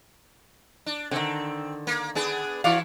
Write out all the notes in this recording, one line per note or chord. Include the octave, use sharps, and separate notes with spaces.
D4
D3 D#3 C4
A#3
B3 D4 G#4
E3 E4 F#4 D5 F5